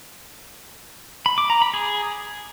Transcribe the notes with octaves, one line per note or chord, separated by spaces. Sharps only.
B5
D6
A#5
B5
G#4